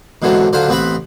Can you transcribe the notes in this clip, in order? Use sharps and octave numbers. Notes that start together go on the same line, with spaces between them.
G#2 B2 D3 E3 F#3 C4
D3 F#3 F4 C5
A1 B3 C4 B4 B5